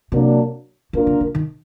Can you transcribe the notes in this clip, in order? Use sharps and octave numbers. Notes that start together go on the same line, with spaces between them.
C3 F#3 A#3 D4
D3 A#3 D4 F4 A#4
C#3
D3
D#3